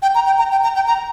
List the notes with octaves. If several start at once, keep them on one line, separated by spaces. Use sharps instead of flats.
G5
A#5
G5
A#5
G5
A#5
G5
A#5